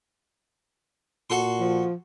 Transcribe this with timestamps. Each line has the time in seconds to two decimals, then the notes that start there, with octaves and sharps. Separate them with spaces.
1.30 A#2 F#4 A4 C6
1.60 F3